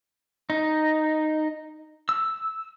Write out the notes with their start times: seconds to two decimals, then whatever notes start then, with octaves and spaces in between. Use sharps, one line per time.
0.50 D#4
2.09 E6